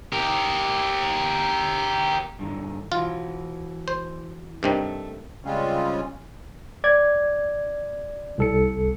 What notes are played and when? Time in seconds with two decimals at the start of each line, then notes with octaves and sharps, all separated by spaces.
0.13 G4 A#4
2.39 G2 D3 D#3
2.92 E3 F4 F#4
3.88 C5
4.63 G2 C3 D#3 A3
5.45 C#3 G3 G#3 C4 C#4 F4
6.84 D5 G#6
8.38 C2 A4 C#7